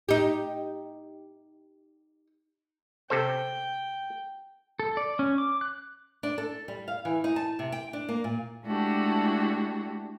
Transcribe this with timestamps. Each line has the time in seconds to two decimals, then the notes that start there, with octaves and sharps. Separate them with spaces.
0.09 D#4 G4
3.10 C3 A4 C5 G5
4.79 A4
4.97 D5
5.19 C#4
5.38 D6
5.61 F#6
6.23 D4
6.38 A4
6.68 G3
6.88 F5
7.05 E3
7.24 D#4
7.36 A5
7.59 C3
7.72 G5
7.93 D4
8.09 A#3
8.24 A#2
8.64 G#3 A3 D4 E4 F#4 G4